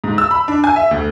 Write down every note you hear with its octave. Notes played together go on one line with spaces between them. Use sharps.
G#2
E6
B5
D4
G#5
E5
D2